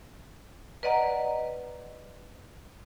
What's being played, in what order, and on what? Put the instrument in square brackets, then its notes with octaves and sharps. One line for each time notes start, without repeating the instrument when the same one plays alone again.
[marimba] B4 D5 D#5 F#5 A#5